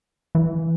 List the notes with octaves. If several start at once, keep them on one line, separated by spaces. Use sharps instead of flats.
E3